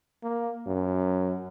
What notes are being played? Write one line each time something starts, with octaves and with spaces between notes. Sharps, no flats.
A#3
F#2